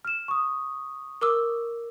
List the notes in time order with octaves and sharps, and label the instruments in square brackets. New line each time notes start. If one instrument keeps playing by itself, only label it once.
[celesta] F6 E7
C#6 D#6
[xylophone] A#4 D6 E6